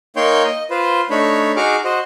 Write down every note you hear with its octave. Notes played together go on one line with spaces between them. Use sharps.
A#3 D#4 C#5 G5 C6 G6
D#5
F4 B4 C5
A3 D4 D#4 C#5 B5
D#4 F#4 G#4 C#6 D6 F6
F#4 C5 D#5